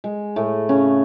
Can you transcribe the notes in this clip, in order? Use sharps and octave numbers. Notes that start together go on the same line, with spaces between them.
G#3
A2 A3
C#3 C#4